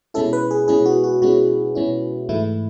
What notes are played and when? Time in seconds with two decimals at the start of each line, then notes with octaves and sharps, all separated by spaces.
0.14 B2 G#3 C#4 E4 A4
0.33 B4
0.51 G#4
0.68 B2 G#3 C#4 E4 G#4
0.86 F#4
1.04 F#4
1.22 B2 G#3 C#4 E4 F#4
1.75 B2 G#3 C#4 E4
2.29 G#2 E3 A3 E4